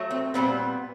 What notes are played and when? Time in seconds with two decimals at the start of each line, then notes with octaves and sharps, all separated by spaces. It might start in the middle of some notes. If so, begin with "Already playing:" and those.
Already playing: F#3 A3
0.11 C4
0.34 A#2 G3 B3 C4